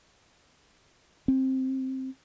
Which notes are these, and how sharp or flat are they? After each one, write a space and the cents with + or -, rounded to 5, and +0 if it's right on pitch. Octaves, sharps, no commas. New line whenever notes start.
C4 +10